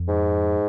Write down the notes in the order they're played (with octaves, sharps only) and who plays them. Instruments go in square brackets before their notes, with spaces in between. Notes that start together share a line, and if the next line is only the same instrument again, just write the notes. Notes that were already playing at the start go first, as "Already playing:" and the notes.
Already playing: [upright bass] F2
[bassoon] G#2